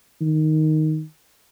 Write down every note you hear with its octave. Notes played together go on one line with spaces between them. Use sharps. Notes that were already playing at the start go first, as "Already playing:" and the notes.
D#3